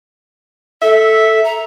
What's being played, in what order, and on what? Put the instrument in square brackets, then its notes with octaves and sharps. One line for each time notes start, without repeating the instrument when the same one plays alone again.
[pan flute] A4 [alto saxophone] E5
[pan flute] A#5